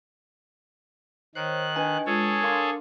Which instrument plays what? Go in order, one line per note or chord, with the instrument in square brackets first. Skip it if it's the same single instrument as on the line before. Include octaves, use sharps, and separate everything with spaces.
[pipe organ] D#3 F#6 [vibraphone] C5 C#5
[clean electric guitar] D4 B4 G#5 [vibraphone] D#5
[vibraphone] G#3 F4 [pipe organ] G#4 A4 C#5
[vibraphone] D4 [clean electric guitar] A#4 F5 C6